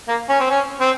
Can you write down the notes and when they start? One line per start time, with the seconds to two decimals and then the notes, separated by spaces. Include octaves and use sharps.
0.08 A#3
0.29 C#4
0.40 C4
0.50 C#4
0.80 C4